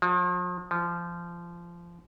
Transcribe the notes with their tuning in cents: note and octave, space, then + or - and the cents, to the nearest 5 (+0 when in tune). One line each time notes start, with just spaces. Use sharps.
F3 +40
F3 -20